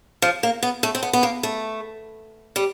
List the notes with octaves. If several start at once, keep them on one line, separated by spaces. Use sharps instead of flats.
F3
A#3
B3
A3
C4
B3
B3
A#3
A3
G3